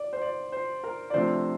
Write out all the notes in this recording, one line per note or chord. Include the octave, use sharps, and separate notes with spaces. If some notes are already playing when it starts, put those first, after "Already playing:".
Already playing: D5
C5
D5
C5
A#4
D5
C3 F3 A3 D4 C5